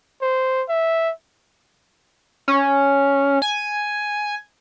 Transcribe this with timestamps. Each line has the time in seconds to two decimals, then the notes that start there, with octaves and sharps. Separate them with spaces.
0.22 C5
0.69 E5
2.48 C#4
3.42 G#5